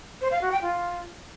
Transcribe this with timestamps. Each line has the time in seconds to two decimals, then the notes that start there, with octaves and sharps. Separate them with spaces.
0.21 C5
0.31 F5
0.41 F#4
0.52 G5
0.62 F4